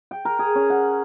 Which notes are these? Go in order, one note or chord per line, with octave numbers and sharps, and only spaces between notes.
G5
A#4
G#4
C#4
F#5